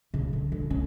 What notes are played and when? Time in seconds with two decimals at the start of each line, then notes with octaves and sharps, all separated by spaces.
0.14 C#3
0.33 D3
0.52 D3
0.70 C#4